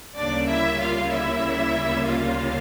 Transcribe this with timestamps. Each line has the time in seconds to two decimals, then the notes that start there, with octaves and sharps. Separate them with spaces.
0.16 D2 C#3 G3 A#3 D4 D5
0.48 E4 E5
0.80 F4 F5
1.11 E4 E5
2.06 F4 F5